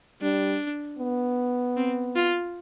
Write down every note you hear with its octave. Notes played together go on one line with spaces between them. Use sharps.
G3 D4
B3
C4
F4